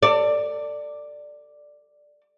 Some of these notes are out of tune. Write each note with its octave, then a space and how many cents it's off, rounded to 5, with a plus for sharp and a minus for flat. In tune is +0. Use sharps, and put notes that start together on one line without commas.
A4 +35 D5 +5